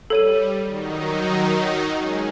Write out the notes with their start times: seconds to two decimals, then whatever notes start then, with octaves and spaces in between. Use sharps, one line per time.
0.10 G3 A4 C#5 D#7
0.66 D#3 F#3 D#4
1.98 G#3 C#4 G#4